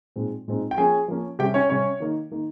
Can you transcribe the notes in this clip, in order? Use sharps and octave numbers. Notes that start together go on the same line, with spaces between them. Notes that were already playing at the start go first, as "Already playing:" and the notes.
A#2 G#3 C4 D#4
A#2 G#3 C4 D#4
G5
F3 A#3 C#4 G#4 G#5
F3 A#3 C#4
C3 G3 C#4 G4 G5
C#4 C#5
C3 G3 C#4 C#5
D#3 A#3 D#4
D#3 A#3 D#4